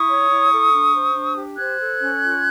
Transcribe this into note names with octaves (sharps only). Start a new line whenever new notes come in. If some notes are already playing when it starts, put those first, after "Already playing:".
Already playing: E4 C#6 D#6
C#5
E4
A4
D4
C5
D4
G4
C5 F#6 G#6
A4
C#4
F4